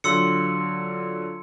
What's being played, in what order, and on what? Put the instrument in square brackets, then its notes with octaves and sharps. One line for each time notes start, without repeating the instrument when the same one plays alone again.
[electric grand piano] D3 F#3 F4 [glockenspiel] C6 E6 C#7